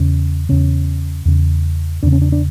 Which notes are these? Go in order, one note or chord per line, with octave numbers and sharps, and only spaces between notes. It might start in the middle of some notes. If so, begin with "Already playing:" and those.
Already playing: E2 C#3 C#4
E2 C#3 C#4
E2 C#3
E2 C#3 D4
C#4
D4
D4